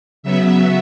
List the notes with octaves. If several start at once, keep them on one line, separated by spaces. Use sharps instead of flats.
C#3 F#3 B3 E5